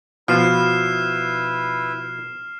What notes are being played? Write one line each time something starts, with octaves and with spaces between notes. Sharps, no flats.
B2 F3 E4 B4 F6 C7 E7